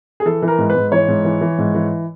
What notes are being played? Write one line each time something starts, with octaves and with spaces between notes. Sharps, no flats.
G#4
E3 A4
E3
A#4
G#2
B4
G#2
E3 C#5
G#2
E3
E3
G#2
E3